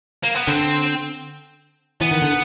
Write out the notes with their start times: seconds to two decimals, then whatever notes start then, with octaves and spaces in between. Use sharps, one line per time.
0.24 A#3
0.35 B3
0.47 D3 C4
2.01 E3 B3
2.11 D#3
2.22 D3